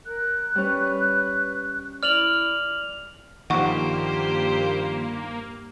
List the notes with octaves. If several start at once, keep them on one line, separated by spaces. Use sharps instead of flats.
A#4 F#6
G3 C#4 B4
E4 D5 F6 F7 F#7
G2 D#3 F3 A#3 G4 C5 F#5 C#6